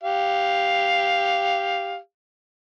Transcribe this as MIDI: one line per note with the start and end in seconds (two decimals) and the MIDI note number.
0.03 1.97 67
0.03 1.97 77